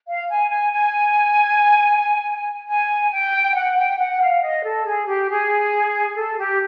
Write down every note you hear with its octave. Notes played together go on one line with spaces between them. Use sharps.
F5
G#5
G#5
G#5
G#5
G5
F#5
G5
F#5
F5
D#5
A4
G#4
G4
G#4
A4
G4